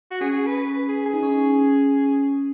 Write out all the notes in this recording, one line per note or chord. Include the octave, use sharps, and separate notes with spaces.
F#4
C#4 G#4
B4
G#4
G#4
D#4
C#4